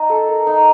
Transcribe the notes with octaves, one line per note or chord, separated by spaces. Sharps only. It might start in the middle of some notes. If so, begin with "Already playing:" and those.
Already playing: D#4 D#5
A4
A#4
D#4